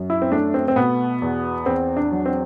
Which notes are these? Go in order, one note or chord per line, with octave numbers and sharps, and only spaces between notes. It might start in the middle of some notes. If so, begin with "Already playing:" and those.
Already playing: F#2
E4
C4
A3 D4
C4
C4
B2 B3
E2
E2 C4
D4
F#3
C4